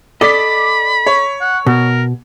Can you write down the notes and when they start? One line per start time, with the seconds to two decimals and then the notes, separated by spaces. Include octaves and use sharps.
0.21 A4 D5 D#5 B5 B6
1.06 C#5
1.41 F#5
1.66 B2 A#4